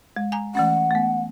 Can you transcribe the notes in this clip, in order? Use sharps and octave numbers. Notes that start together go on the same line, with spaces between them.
G#3
G#5 A#5
E3 A3 C#4 F#5
A3 B3